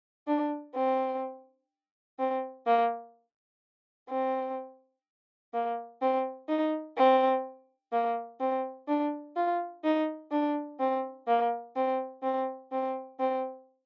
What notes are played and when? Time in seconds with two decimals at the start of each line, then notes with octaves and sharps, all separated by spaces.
0.27 D4
0.75 C4
2.19 C4
2.66 A#3
4.09 C4
5.54 A#3
6.02 C4
6.49 D#4
6.98 C4
7.93 A#3
8.40 C4
8.88 D4
9.36 F4
9.84 D#4
10.32 D4
10.80 C4
11.27 A#3
11.76 C4
12.23 C4
12.72 C4
13.20 C4